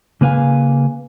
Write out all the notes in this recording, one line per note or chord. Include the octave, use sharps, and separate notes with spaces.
C#3 A#3 B4 F5 G#5